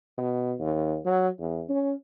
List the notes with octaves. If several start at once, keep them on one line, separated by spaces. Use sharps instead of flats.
B2
D#2
F#3
E2
C#4